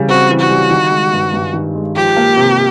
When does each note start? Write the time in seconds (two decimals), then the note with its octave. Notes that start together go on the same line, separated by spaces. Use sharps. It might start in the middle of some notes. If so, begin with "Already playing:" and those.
Already playing: C#3 E3 G3
0.09 C4 F#4
0.29 E3
0.40 F#4
0.50 G3
0.70 D#3
0.91 G#3
1.13 G2
1.34 G2
1.53 D#3
1.75 G#3
1.95 F3 G4
2.17 A#3
2.37 C3